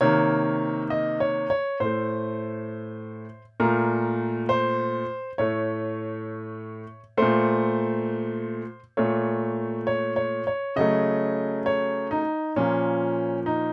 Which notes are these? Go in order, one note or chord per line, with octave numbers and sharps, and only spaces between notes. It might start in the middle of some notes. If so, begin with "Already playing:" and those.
C3 D#3 A#3 C#5
D#5
C#5
C#5
A2 A3 C5
A#2 A3 A#4
C5
A2 A3 C#5
A#2 A3 C5
A#2 A3 C#5
C#5
C#5
C#5
C#3 F#3 A3 D#5
C#5
D#4
A#2 F3 A#3 C#4
D#4